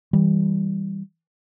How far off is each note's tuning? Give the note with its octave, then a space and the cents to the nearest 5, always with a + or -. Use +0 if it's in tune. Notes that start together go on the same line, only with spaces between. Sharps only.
E3 -25 G3 +0